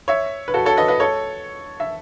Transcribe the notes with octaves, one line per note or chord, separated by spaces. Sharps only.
C#5 E5
B4
F#4 A4
A4 C#5
B4 D#5
B4 D#5
A4 C#5
E5